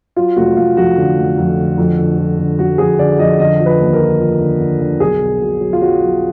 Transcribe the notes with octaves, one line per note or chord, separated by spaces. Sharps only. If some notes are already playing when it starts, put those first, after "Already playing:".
F#3 F4
F1 F#4
F1 F4
F2 F#4
D3
F1
F2
D3
F2
D3
F3
D3
F2 F#4
F2 G#4
D3 D5
F2 D#5
D3 D#5
F3
B4
D#2
A#4
F3
F3
D3
D3
D3
B1 G#4
B2
B2
F#3
F4
F#3 F#4
F#3